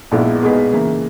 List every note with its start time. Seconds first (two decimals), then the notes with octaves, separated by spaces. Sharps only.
0.11 A#1 A#2 G#3 B3 E4
0.42 B2 G#3 D#4 G#4 B4
0.72 C#3 E3 A#3